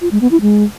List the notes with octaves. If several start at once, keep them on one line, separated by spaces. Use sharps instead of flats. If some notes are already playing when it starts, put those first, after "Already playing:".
F4
G#3
B3
E4
G#3